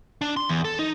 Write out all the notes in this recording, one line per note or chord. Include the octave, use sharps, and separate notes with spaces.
D4
C6
E2
A4
D#4